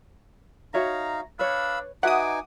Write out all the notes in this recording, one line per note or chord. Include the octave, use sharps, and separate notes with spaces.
D#4 F#4 C#5 E5 F5 A#5
D4 B4 C#5 F5 B5 E6
D#4 F#4 B4 E5 F#5 G#5 D6 D#6